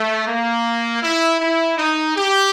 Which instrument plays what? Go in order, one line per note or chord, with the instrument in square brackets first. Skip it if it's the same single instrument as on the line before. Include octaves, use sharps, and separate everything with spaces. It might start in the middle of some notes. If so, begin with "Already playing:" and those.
Already playing: [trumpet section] A3
A#3
E4
E4
D#4
G4